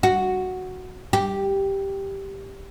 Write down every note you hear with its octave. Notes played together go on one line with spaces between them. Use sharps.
F#4
G4